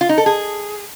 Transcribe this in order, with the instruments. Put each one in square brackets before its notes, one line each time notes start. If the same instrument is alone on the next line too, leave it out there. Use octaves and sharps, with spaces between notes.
[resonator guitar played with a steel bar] F4
D#4
A4
G#4